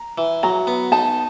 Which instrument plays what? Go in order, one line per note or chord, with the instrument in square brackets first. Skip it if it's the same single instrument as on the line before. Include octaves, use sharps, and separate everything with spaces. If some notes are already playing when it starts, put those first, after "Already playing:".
Already playing: [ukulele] A#5
[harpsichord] E3
[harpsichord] F#3 [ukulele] A#5
[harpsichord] B3
[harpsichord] D#4 [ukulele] A5